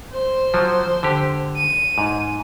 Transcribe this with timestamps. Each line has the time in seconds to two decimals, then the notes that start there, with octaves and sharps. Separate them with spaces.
0.12 C5
0.54 F3 F#3
1.03 D3 G4
1.56 D#7
1.98 G#2